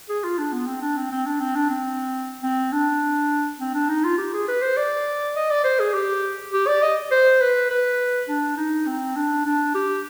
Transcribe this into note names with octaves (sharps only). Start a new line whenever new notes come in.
G#4
F4
D4
B3
C4
D4
C4
C4
D4
C4
D4
C4
C4
D4
C4
D4
D#4
F4
G4
G#4
B4
C5
D5
D#5
D5
C5
G#4
G4
G4
D5
D#5
C5
B4
B4
D4
D#4
C4
D4
D4
G4